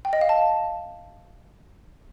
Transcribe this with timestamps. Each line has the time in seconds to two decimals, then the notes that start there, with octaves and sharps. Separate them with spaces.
0.05 G5
0.13 D#5
0.21 F5
0.29 A5